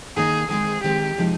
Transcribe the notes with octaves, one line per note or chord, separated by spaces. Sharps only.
D#3 A#3 D#4 G#4
D#3 G#3 C4 D#4 G#4
D#3 G#3 C4 D#4 G4
C3 F3 G#3 D#4